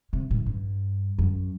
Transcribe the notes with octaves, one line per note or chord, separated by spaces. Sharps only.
C3
A2
G2
F#2